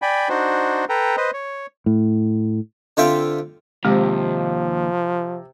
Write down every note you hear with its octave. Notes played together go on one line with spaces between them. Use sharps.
D5 G5 G#5 B5
D4 D#4 F#4 C5
A4 B4 G5 A#5
B4 C5 D#5
C#5
A2
D3 C4 F4 E5 F5 G5
D#2 C3 F3 G#3